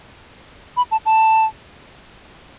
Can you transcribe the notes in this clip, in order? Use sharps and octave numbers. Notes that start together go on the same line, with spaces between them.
B5
A5
A5